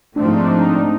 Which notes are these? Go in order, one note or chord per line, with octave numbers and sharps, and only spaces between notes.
G#2 F3 A3 C4 D4
D#4
D4
D#4
D4
D#4